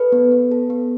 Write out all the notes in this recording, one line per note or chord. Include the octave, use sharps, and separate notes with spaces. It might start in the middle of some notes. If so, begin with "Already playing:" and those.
Already playing: A4 B4
B3
B3
A4
B3